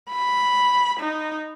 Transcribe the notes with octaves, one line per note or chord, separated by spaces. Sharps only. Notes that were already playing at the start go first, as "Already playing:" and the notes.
B5
D#4